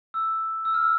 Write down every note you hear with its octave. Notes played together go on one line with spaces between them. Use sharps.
E6
E6
F6
E6